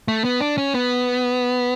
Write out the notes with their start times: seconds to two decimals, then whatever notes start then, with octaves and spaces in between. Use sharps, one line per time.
0.08 A3
0.24 B3
0.41 D4
0.58 C#4
0.74 B3